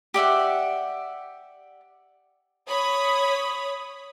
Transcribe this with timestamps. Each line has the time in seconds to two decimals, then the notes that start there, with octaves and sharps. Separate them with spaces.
0.14 G4 D5 E5 F#5
2.70 C#5 B5 D#6